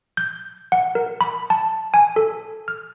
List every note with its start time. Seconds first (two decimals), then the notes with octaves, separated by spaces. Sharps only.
0.17 G6
0.72 F#5
0.95 A#4
1.21 B5
1.50 A5
1.94 G#5
2.16 A4
2.68 F6